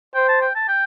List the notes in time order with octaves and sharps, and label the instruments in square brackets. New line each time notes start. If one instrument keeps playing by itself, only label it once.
[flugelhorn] C5 [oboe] G5
[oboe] A5
G5
A5
G5